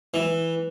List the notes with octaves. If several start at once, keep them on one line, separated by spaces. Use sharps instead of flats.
E3